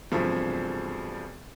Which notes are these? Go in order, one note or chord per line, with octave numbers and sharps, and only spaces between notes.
E1 G2 C3 F3 A3